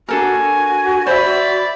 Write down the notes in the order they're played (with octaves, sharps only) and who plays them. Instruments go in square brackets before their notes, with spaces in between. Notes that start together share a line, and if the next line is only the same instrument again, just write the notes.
[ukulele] D4 A4 A#4 [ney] F#4 [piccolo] G#5
[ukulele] C5 E5 [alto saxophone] D5 [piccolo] B5